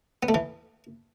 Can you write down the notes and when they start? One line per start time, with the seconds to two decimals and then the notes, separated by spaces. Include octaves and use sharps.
0.23 B3
0.29 A3
0.34 E3